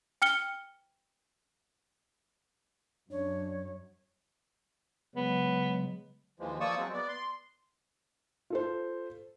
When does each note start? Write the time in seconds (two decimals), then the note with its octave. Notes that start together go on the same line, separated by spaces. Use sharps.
0.22 G5 F6 C#7 G7
3.11 F#2 D4 C#5
5.16 C#3 F#3 G#3 B3
6.40 D#2 E3 F3 G#3
6.61 F3 A#3 D5 C#6 D#6 E6
6.78 F#3 G#3 C4
6.94 B3 D5
7.08 C6
8.50 F4 A4 C5